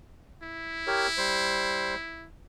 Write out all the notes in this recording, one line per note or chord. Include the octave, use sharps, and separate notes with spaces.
E4
G4 A#4 C#5
G3 C5